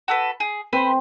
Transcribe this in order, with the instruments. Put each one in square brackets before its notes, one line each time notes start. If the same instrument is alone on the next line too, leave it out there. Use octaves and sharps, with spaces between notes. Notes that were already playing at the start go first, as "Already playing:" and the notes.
[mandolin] F#4 A4 B4
G#4
[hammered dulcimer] C4 [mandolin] B4 C5 B5